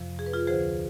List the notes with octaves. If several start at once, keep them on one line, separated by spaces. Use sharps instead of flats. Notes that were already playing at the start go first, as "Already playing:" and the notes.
Already playing: F2 C3 F3
G#4
B4
F4 G#4
D2 D3 F3 G#4 C5